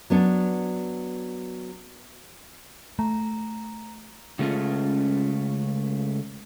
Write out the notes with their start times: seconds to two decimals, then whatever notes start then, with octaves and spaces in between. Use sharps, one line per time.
0.10 F#3 B3 D4
2.99 A3 A#5
4.39 C#3 G#3 A3 C#4 F4